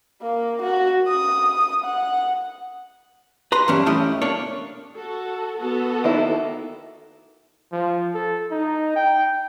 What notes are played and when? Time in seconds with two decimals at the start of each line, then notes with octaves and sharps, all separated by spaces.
0.22 A#3
0.62 F#4
1.07 D#6
1.84 F#5
3.52 B4 A#5 C6
3.68 G2 A#2 E3 C#4 D4
3.86 A3 C#4 E4 G4 D#5
4.22 A#3 D4 C#5
4.96 F#4 A4
5.58 B3 F#4 A4
6.04 D#3 A#3 E4
7.72 F3
8.15 A4
8.51 D#4
8.96 G5